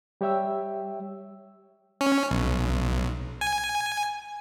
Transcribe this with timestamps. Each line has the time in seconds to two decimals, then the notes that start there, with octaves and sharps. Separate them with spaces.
0.21 G3 G4 C#5 E5 G5 E6
2.01 C#4
2.31 B1
3.41 G#5